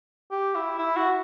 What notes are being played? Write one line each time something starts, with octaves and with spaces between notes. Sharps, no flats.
G4
E4
E4
F#4